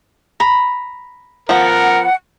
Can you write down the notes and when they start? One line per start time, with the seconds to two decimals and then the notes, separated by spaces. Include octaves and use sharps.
0.40 A#5 B5
1.49 F3 B3 A#4 F#5